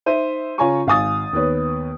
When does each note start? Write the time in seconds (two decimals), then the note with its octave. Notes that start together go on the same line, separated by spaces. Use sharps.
0.06 D#4 C5 E5 D#7
0.58 C#3 F4 C#5 G#5 A#5 C#6
0.87 G#1 F5 G#5 D#6 A6
1.33 D#2 B3 B4 C#5